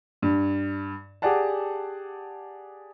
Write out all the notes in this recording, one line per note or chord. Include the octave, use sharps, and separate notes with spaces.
G2
G4 G#4 D5 F#5 A5